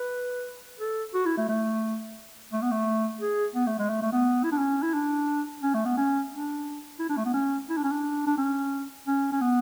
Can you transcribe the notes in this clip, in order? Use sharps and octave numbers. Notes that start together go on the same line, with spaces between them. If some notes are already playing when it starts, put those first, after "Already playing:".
Already playing: B4
A4
F#4
E4
A3
A3
A3
B3
A3
G#4
B3
A3
G#3
A3
A3
B3
E4
D4
C#4
E4
D4
C#4
A3
B3
C#4
D4
E4
D4
A3
B3
C#4
E4
D4
C#4
D4
D4
C#4
C#4
C#4
B3